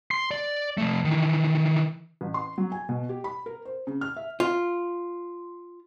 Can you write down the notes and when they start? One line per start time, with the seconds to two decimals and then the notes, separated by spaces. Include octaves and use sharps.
0.11 C6
0.31 D5
0.78 F3 A3
1.05 D#3 E3
2.21 A1
2.34 C6
2.58 F#3
2.72 G#5
2.89 B2
3.09 G4
3.24 B5
3.46 A#4
3.65 C5
3.87 C#3
4.01 F6
4.17 E5
4.40 F4